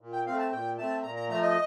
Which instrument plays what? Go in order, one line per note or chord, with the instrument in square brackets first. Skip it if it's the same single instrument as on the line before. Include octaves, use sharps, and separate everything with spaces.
[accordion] A#2
G5
A3 C4 F5
A5
A#2 G5
A3 C4 A5
A#2 A#5
A#5
F3 A3 A#5
D#5